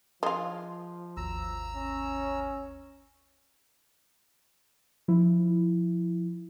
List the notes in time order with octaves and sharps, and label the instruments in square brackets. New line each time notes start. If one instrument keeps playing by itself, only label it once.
[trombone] F3 [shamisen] G#3 F4
[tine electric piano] G#1 D#2 [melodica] A#5 E6
[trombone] C#4
[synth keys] F3 E4